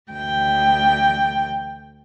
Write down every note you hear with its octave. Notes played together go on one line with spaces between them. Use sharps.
D2 G5